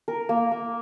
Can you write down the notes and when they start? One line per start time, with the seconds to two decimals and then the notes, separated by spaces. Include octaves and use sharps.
0.08 A#4
0.29 A#3
0.52 A#3